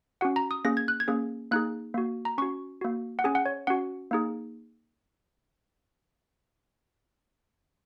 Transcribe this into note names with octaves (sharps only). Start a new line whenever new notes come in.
C#4 F#4 F#5
A#5
D#6
A#3 C#4 G#4 A#6
G#6
F#6
G#6
A#3 C#4 G#4
A#3 D#4 G#4 F#6
A#3 F#4
A#5
C#4 F#4 C#6
A#3 F#4
F#5
C#4 G#4 G#5
F#5
C#5
C#4 F#4 F#5
A#3 D#4 G#4